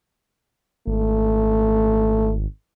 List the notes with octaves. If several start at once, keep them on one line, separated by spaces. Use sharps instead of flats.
G#1 A3